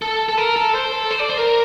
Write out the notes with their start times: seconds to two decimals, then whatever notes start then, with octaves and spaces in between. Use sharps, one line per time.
0.02 A4
0.29 A4
0.38 A#4
0.56 A4
0.75 C5
0.92 A4
1.11 C5
1.19 D5
1.29 C5
1.37 A#4